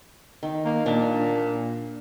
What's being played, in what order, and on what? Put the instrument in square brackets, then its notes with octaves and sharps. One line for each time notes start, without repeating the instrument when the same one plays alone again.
[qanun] D#3
[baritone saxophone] A#3
[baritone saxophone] A#2 [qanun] D4